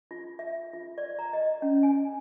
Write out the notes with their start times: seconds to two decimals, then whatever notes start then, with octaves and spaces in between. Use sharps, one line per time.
0.11 F4
0.39 E5
0.73 F4
0.98 D5
1.19 A#5
1.33 D#5
1.62 C#4
1.83 G#5